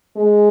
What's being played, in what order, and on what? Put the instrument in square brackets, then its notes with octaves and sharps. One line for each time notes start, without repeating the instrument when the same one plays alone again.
[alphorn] G#3